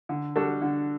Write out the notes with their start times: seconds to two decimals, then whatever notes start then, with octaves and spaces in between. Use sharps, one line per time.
0.09 D3
0.36 G3 D4 F#4 A4
0.62 D3